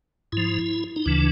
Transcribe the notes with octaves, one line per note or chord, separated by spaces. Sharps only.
G#2 F3 E4
D#4
D2 C#3 E3 D4